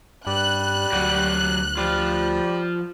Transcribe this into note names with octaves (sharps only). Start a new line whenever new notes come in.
G2 G3 F#6
D2 F#3 F#4 G4
F3 G3 F4